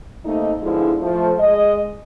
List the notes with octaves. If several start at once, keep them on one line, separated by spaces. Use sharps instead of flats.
C3 A3 A#3 D#4
G#2 B2 D3 F3 G#3 E4
F3 A3
G#3 D#5